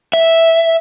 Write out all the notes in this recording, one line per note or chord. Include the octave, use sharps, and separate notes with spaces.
E5